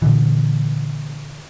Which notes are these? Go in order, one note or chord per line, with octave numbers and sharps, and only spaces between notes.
A#2 D3 E3